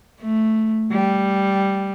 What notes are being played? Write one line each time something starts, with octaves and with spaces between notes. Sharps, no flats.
A3
G3